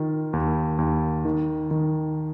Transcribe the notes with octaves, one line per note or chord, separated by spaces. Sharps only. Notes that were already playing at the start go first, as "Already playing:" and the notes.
Already playing: D#3 F4
D#2
D#2
D#3
D#3